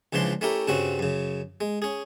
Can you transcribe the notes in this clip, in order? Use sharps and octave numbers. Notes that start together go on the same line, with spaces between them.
C#2 C#3 E3 F3 D4 C6
A3 C#4 E4 G4 A#4
G2 C#3 C4 C#4 F#4
F#2 C#3
G#3
C#4 G#4